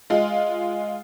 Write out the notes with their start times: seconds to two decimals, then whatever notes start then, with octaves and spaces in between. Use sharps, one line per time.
0.10 G#3 F4